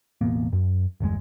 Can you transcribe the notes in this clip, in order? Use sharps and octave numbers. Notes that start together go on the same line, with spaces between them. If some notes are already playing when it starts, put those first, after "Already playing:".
E1 A1 A#3 B3
F#2
G1 E2 B2 G#3